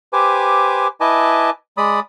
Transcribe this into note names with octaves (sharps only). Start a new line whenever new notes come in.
G4 B4 C5 G#5 D6
E4 B4 D#5 G#5 A5 D6
G#3 D5 B5 D#6